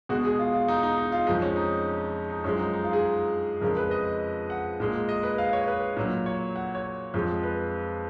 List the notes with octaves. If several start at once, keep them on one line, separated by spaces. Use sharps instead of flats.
B2 G#3 F#4
G#4
F4
F4
D#4
D#4
D#4
F4
F2 F3 G#3 D#4
C#4
D#4
D#4
F#2 F3 G#3 C#4
D#4
D#4
F4
G#4
F2 C#3 G#3 A#4
B4
D#5
F#5
A#2 G#3
D#5
B4
F5
C#5
B4
A#2 F#3
C#5
F#5
C#5
F2 F3 G#3
B4